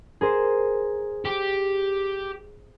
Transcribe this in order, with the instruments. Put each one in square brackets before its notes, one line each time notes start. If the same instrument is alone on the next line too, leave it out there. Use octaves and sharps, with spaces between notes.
[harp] G#4 A#4 C5
[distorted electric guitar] G4